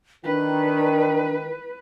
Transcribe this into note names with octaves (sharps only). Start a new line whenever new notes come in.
D#3 D4 B4